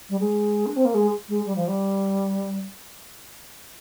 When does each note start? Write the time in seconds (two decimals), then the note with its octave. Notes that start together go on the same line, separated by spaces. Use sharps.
0.09 G3
0.19 G#3
0.65 D4
0.76 C4
0.84 A#3
0.94 G#3
1.28 G#3
1.45 G3
1.55 F3
1.67 G3